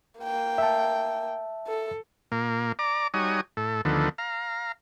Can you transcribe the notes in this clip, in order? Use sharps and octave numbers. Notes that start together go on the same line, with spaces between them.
A#3 G5
E5 A5
A4
A#2 A#3
D5 A#5 D6
G3 D#4 F#4 C#5 G#5 D#6
A2 A4
D2 D3 D#3 F3 B3 A4
F5 A#5